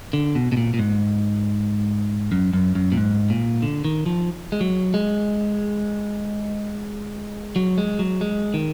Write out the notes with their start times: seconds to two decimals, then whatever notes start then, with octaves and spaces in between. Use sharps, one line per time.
0.13 D3
0.35 B2
0.52 B2
0.57 A#2
0.74 A#2
0.79 G#2
2.32 F#2
2.53 F#2
2.75 F#2
2.92 A#2
2.97 G#2
3.30 A#2
3.62 D3
3.85 D#3
4.06 F3
4.52 G#3
4.61 F#3
4.94 G#3
7.56 F#3
7.78 G#3
7.99 F#3
8.21 G#3
8.54 D#3